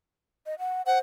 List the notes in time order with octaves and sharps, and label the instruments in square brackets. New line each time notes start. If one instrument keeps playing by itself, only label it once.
[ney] D#5
F#5
[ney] C5 [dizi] F#5